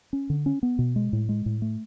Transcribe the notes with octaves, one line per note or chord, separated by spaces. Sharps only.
C#4
D3
C#4
B3
B2
G#3
A2
G#3
A2
A3